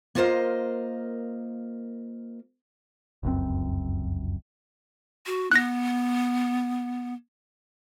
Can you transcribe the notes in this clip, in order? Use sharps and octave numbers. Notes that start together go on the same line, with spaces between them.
A#3 F4 A#4 C5 D#5 F5
F1 C#2 F#2 C4
F#4
B3 F#6 A#6